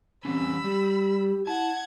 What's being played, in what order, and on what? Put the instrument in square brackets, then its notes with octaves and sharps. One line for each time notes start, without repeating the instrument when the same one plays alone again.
[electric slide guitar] E3 G3 C#4 [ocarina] C4 [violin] B5 E6
[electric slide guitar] G3 [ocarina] G4
[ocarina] E4 [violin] F#5 G#6 [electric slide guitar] A5